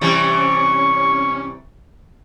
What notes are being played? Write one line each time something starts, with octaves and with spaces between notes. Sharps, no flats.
C3 E3 G3 C#4 C#6